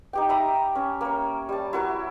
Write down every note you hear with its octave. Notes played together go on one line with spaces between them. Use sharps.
D#4 G4 G5
E5 A#5 B5
C#4
A#3 C#5
G3 A5
E4 F#4 A#4